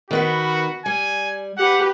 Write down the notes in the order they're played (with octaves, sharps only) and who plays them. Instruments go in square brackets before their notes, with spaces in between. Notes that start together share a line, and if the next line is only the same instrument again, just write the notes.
[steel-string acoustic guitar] D#3 B3 B4 [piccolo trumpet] F#4
[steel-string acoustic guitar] G3 [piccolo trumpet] G#5
[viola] G4 B4 [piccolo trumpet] F#5